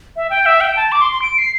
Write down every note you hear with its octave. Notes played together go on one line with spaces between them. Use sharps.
E5
G5
E5
G5
A5
D6
C6
C6
D7
C7